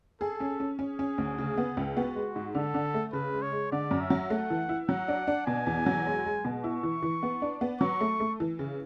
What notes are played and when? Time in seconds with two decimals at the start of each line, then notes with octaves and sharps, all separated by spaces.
0.21 G#4 A4
0.40 C#4
0.60 C#4
0.79 C#4 G#4
0.99 C#4
1.18 D2
1.38 C#3
1.58 B3
1.77 C#2
1.97 B3 F#4
2.15 G#3
2.36 G#2
2.55 D3 A4
2.74 D3
2.94 A3
3.13 C#3 B4
3.33 G#3
3.42 C#5
3.52 G#3
3.72 D3 D5
3.91 F#2
4.00 E5
4.10 F#3
4.30 A3 F#5
4.50 E3
4.69 E4
4.89 F#3 F#5
5.08 D4
5.27 D4
5.47 B2 G#5
5.67 E2
5.86 F#3
6.06 G#3
6.25 G#3
6.45 B2
6.64 E4 C#6
6.83 E3
7.02 E3
7.23 B3
7.42 D4
7.61 B3
7.81 F#3 C#6
8.01 A3
8.20 A3
8.40 E3
8.59 C#3